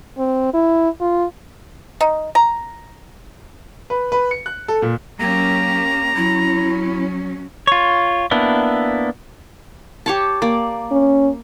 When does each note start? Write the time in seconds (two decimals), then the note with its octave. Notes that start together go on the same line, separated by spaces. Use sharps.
0.18 C4
0.54 E4
1.01 F4
2.01 D#4
2.35 A#5
3.90 B4
4.12 B4
4.31 C#7
4.46 F#6
4.68 A4
4.82 A#2
5.20 F#3 A#3 C#4 G4 A#5
6.16 F#3 C#4 E4
7.67 F4 C#5
8.31 A#3 B3 D4 E4
10.06 G4 C#5 A5
10.42 A#3 D5
10.91 C#4